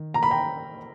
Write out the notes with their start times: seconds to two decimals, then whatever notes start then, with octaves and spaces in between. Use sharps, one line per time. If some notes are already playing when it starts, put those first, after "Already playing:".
Already playing: D#3
0.14 A#5
0.23 B5
0.31 G5 A#5